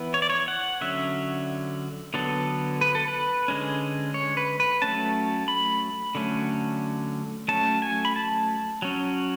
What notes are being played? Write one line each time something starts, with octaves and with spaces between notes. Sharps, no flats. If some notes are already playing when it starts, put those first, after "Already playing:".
Already playing: E3 B3
C#5
D5
C#5
F#5
D3 F#3 C#4 E5
D3 F#3 B3 A4
B4
A4
B4
D3 G#3 C#4
C#5
B4
B4
F#3 A3 C#4 A5
B5
D3 F#3 A3 C#4
F#3 A3 C#4 A5
G#5
B5
A5
F#3 C#4